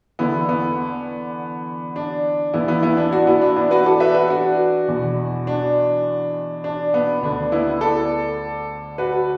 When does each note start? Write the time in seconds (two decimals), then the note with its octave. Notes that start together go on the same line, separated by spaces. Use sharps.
0.19 E2 D3 B3 E4
0.49 B3
1.96 D4
2.54 E2 E3 B3 E4
2.68 B3 E4
2.83 B3 E4
2.97 D4
3.12 D4 F#4
3.27 B3 E4
3.41 D4
3.56 B3 E4
3.71 F#4 B4
3.86 A4 D5
4.00 B4 E5
4.14 F#4 B4
4.29 D4 F#4
4.88 E2 B2
5.47 D4
6.64 D4
6.94 B3
7.23 D2 D3 D4
7.52 B3 E4
7.81 A4 D5
8.98 F#4 B4